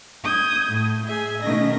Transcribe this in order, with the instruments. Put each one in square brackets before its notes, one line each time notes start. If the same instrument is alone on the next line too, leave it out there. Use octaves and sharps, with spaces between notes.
[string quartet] D#6 G6 G#6
A2
G#4 E5 G#5
B2 D#3 A3 C#4 D#5 A#6